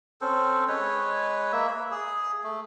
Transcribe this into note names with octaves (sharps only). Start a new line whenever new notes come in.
C4 C#4 A4 C5
G#3 B4 C#5
A#3 E5
B5
G#4
A3